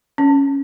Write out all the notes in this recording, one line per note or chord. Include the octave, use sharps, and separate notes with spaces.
C#4